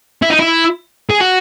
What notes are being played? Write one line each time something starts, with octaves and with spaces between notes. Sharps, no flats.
E4
D#4
E4
G#4
F#4